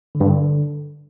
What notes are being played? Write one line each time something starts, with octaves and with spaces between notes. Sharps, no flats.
D3
G2
D3